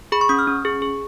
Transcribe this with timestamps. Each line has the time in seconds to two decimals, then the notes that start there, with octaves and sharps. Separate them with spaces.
0.12 G#4 B5
0.21 C#6
0.29 C#4 D#6
0.39 F6
0.47 C#4
0.65 G#4
0.82 G#4